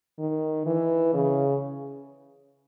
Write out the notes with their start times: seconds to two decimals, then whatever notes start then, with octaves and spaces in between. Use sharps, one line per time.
0.19 D#3
0.66 E3
1.14 C#3